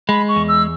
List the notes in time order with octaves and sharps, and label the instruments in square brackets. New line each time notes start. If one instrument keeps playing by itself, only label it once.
[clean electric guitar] G#3 [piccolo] B5
[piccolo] C#6
[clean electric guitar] E2
[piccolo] E6